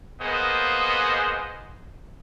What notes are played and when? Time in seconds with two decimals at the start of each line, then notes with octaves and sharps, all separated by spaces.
0.21 A#3 B3 F4 G#4 C5 D#5